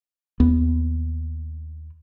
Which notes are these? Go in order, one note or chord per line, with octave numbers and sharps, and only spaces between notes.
D#2 B3